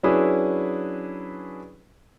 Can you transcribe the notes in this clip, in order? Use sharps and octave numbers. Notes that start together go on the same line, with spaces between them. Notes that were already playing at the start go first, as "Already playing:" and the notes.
F#3 C#4 D4 E4 G#4 B4